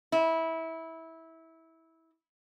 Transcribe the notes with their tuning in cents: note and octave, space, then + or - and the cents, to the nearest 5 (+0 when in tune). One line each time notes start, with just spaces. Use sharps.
E4 -20